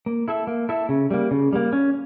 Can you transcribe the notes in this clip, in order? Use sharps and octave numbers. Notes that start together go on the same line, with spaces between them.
A#3
E4 A4 E5
A#3
E4 A4 E5
C#3
G3 A#3
C#3
G3 A#3
C#4